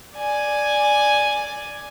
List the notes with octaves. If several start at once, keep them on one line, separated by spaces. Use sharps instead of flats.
D5 G#5